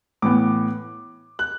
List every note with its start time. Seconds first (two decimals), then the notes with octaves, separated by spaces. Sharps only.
0.22 A2 E3 B3 D6
1.39 F#6